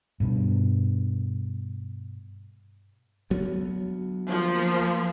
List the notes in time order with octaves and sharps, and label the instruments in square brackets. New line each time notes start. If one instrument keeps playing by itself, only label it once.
[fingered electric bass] G2 B2
[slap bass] D2 F#3 B3
[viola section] F3 A#3